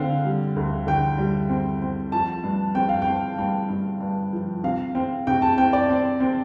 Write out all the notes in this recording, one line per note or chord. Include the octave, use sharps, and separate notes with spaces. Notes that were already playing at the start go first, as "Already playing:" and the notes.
Already playing: D3 C4 F5
G3
D2
D3 G5
G3
C4
C4
F3 A5
G2
C4 G5
F5
G5
C4
G2 G5
G2
G2
F3
C3 F5
C4
C3 G5
A5
C4 G5
D5
C4
C4